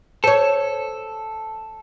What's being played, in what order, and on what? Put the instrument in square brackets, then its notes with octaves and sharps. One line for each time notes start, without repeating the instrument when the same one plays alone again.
[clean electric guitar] A4 [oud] C5 C#5